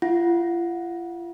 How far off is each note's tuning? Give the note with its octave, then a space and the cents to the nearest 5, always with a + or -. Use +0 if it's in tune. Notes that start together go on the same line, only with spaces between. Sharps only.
F4 -40 F#5 -15